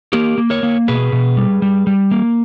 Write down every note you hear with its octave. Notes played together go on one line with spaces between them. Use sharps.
A#3 G4 A#4
A#3
A#4 C#5
A#3
B2 G#4 B4
B2
G3
G3
G3
A#3